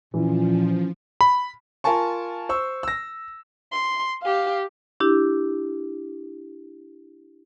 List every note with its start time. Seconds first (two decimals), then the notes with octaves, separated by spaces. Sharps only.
0.14 A#2 E3 F3 C#4
1.21 B5
1.84 F4 A#4 G#5 A5 C#6
2.49 C5 C#6 E6
2.83 E6 A#6
3.72 C6
4.22 G4 F5
5.00 D4 E4 G4